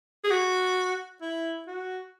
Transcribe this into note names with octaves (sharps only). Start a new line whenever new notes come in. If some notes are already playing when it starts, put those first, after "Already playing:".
G#4
F#4
E4
F#4